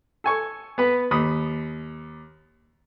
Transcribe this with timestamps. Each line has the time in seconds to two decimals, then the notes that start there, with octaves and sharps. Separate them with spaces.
0.24 A4 G#5 C#6
0.78 B3 B4
1.11 D#2 B5 D#6